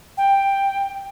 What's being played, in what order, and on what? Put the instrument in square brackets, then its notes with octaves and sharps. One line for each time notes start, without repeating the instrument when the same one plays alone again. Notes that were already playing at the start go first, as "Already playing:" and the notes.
[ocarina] G5